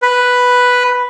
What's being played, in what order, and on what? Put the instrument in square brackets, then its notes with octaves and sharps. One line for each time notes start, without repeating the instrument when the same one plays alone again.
[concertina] B4